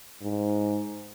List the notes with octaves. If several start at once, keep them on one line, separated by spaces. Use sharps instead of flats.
G#2